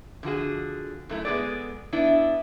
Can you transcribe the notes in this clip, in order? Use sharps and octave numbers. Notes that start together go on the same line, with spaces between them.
D3 F3 F#4 G#4
F#2 A3 E4
G#3 B3 D4 G#4 A4 D5
B3 D4 E4